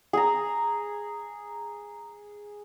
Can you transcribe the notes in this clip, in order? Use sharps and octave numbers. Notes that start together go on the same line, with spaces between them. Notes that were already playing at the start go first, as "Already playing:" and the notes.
G#4 A#5